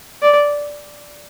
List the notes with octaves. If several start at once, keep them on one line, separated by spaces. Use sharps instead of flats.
D5